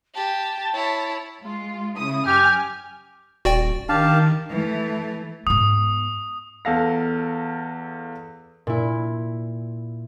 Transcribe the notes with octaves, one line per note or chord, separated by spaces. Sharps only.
G4 A5
E4 C#5
G#3 F4
C#3 E4 D#6
F#2 G4 G#5 F6
D#1 F#4 D5 G5
D#3 D4 G4 F5 A5
E3 A3
G#2 B3 D#6
E2 A4 F5 A#6
A#2 E4